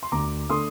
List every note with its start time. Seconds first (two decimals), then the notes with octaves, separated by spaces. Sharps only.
0.03 C6
0.12 D2 A#5 D6
0.50 D3 A3 C6 D#6